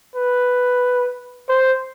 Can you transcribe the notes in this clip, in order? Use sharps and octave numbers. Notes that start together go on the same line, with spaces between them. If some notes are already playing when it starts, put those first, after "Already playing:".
B4
C5